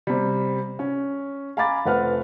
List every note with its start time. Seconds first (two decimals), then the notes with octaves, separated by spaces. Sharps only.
0.07 C3 G3
0.79 C#4
1.57 F5 G#5 A#5 B5 D6 A6
1.85 F1 C4 B4 F#5 F6